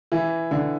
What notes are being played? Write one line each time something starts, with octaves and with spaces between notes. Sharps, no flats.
E3
D3